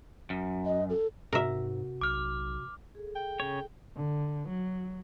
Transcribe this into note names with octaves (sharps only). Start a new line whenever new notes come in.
F#2
D#5
A4
G#2 C3 F#4 A#4 E5
B1 D6 F6
G#4 A4
G5
C#3 C#5
D3
F#3